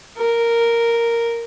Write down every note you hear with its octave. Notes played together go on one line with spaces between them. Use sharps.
A#4